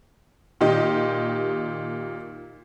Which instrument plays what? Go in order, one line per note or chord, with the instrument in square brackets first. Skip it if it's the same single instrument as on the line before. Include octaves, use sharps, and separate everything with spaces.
[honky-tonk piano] A#2 D#3 G4 D#5